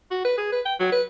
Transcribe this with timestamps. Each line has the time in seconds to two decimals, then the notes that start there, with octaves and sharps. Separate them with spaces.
0.11 F#4
0.25 B4
0.38 G#4
0.52 B4
0.65 G5
0.80 F#3
0.92 B4